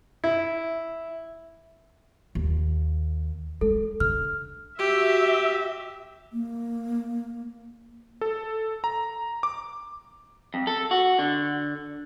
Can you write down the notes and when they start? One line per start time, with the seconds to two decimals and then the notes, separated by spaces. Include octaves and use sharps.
0.24 E4
2.35 D#2
3.61 G#3 A4
4.00 D3 F6
4.79 F#4 G4 E5
6.33 A#3
8.21 A4
8.84 A#5
9.43 D6
10.54 F2
10.67 A4
10.91 F#4
11.19 D3